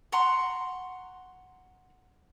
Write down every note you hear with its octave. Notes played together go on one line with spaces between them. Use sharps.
F#5 A#5 C6 C#6